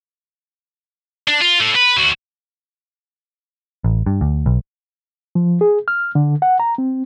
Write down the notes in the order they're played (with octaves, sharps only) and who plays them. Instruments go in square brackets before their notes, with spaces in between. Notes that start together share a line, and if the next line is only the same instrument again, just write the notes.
[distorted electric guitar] D4
F4
A2 A3
B4
D2 F#4
[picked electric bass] A1
G2
D2
B1
[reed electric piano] F3
G#4
F6
D3
F#5
A#5
C4